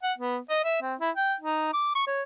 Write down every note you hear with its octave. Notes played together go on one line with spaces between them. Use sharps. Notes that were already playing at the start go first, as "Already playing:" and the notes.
F#5
B3
D#5
E5
C4
E4
G5
D#4
D6
C#6
C#5